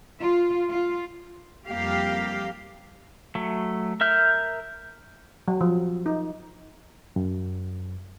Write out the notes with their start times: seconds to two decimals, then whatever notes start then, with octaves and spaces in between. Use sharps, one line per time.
0.20 F4
0.69 F4
1.68 F2 G3 A#3 G4 F5
3.35 F#3 A3
4.01 A#4 E5 F6 G6
5.48 F#3
5.61 F3
6.06 D#4
7.16 F#2